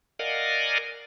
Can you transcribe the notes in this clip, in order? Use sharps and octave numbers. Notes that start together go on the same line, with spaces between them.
A#4 D5 D#5 F5 F#5 G#5